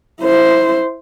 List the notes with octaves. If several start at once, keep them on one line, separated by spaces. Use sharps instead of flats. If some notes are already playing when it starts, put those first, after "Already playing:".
E4 C5